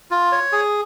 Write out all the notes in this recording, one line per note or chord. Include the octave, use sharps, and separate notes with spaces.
F4
C#5
G#4